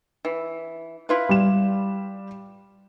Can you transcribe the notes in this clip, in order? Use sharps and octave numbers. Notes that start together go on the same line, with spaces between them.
E3
E4 F4 B4
G3 E7